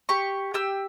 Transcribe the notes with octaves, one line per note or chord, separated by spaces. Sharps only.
G4 C#6
G4 E6